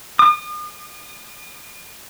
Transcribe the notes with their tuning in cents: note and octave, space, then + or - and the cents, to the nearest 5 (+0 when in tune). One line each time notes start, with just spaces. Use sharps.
D#6 -40